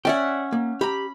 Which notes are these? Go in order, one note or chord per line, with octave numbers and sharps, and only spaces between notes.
C#4 C#5 D5 E5 F#5 G5
A#3
G4 A#5 B5